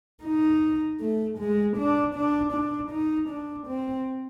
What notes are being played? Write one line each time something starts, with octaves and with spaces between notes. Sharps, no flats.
D#4
A3
G#3
D4
D4
D4
D#4
D4
C4